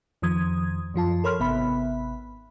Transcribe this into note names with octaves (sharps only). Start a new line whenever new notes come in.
F2 D#3 F3 D#6 G#6
F#2 F3 F4 A5
A4 A#4 C#5 B5 C6 F6
G#1 C3 B3 E5 B5